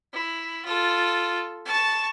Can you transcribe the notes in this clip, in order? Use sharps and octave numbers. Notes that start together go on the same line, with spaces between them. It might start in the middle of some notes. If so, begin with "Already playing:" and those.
E4
F4 A4
A5 C#6